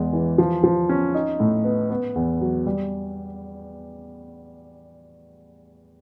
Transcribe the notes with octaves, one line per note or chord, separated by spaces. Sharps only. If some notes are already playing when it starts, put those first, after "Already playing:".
Already playing: E2 G#3
E3
F3
F3
C#4
D#4
A2
B3
B3
E2
F#3
G3